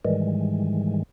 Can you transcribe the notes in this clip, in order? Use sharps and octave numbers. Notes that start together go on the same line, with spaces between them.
G#2 D#3 E3 G3 G#3